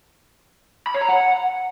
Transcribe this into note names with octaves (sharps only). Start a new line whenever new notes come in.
B5
C#5
A#5
F#5